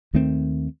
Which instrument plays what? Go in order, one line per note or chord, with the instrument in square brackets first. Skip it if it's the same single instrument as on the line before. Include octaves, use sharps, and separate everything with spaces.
[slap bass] D#2 D#3 A3 C4